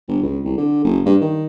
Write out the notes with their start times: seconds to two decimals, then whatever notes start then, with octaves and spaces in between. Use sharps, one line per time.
0.08 G1
0.23 C#2
0.45 C2
0.58 D3
0.85 F#1
1.06 G2
1.21 D#3